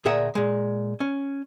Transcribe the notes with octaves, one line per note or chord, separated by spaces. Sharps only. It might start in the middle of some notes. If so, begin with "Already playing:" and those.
D2 A#2 G#4 A#4 E5 F#5
A#2 G#3
C#4